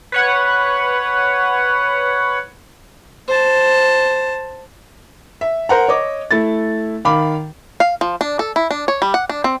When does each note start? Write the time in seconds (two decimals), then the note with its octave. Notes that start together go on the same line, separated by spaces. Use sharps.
0.12 B4 C#5 F#5
3.28 C5 A5
5.41 E5
5.69 A#4 C5 F#5 A#5
5.88 C#5 D#5 D6
6.31 A3 E4 A6
7.05 D#3 F5 B5 D6
7.80 F5
8.01 F3
8.21 D4
8.39 A4
8.56 E4
8.71 D4
8.88 C#5
9.02 G3
9.14 F#5
9.29 D4
9.44 C4